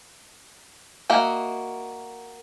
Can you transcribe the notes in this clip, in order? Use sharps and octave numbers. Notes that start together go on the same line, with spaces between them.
A#3 F#4 D#5 E5